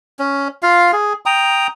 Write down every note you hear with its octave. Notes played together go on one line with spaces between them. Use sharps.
C#4
F4 F5
G#4
G5 A#5 D#6